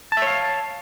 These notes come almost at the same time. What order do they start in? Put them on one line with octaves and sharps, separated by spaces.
A5 E5 C#5 F5